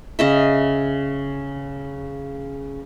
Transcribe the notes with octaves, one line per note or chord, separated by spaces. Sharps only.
C#3 D#5 E5